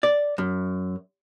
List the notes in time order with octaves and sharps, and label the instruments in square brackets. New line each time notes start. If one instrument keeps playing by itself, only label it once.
[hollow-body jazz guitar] D5
F#2